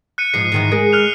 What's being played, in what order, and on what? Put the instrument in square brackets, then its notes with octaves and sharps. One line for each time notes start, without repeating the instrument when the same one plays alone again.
[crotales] F#6 C#7 D#7
[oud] G#2 F3 [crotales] C7
[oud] G#2 D#3 E3
G#3 G#4 A#4
[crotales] F6 F#6 F7